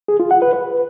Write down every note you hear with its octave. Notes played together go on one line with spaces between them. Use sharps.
G#4
F4
F#5
B4
B4